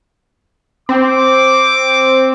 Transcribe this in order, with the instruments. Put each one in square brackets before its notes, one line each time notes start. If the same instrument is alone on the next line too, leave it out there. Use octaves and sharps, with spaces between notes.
[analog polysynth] C4 [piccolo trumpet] D6